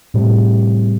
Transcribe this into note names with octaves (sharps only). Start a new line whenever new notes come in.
A2 C3 G3